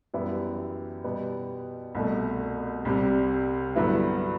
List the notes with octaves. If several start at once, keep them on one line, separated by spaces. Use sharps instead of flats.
F#2 E3 G3 B3 E4
B2 G3 B3
C2 B2 A3
C2 C3 G3
G2 D3 F#3 B3 E4